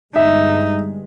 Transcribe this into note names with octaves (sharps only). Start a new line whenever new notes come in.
G1 G2 G#3 D#4 E5